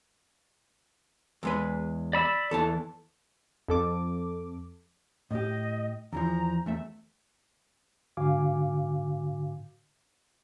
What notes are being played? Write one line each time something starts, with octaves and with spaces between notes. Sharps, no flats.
E2 G#3 B4
D5 B5 E6
E2 E3 A4 A5
F2 A4 D6
A2 G4 D#5
E2 E3 F3 A#5
E2 A3 E5
G#2 D3 F#4 F5 G#5 D6